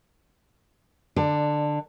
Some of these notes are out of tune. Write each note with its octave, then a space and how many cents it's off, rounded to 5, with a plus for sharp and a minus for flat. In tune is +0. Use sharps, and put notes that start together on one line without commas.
D3 +10 D5 +25